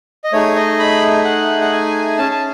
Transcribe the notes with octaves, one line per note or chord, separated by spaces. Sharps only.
D#5
A3 D#4 G#4 C#5
D#5
B5
F#5
F#5
G#5
C#4 G#4 A5
A5